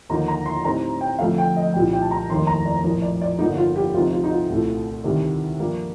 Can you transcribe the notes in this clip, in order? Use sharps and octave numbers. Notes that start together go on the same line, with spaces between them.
D#2 D3 F3 A#3 D#4 A#5
A#5
C6
A2 G3 C4 D#4 A#5
G5
F1 F2 D3 A3 F5
G5
D#5
C2 A#2 G3 G5
G5
A5
A#5
F1 D#2 D#3 A#3 D#4 C6
A#5
D5
A#1 A2 F3 A#4
D5
D5
G1 G2 D3 F3 A#3 D#4
F4
G4
D2 C3 F3 C4 D#4 F4
F4
D#4
F4
C2 A#2 A3
D2 C3 D#3 G3
G2 F3 A#3 D4